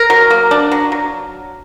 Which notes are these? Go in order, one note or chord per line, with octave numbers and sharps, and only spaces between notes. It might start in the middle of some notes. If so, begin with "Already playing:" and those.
Already playing: A#4
F#3
A#3
D4
F#3
F#3